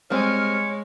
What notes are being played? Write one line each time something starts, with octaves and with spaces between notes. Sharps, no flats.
G3 G#3 C4 C#5 F6